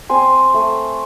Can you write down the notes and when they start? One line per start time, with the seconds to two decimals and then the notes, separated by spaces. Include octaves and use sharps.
0.09 C4 G#5 C6
0.54 A3